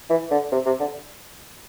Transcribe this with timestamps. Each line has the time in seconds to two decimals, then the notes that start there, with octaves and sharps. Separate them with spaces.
0.10 E3
0.31 D3
0.52 C3
0.66 C3
0.80 D3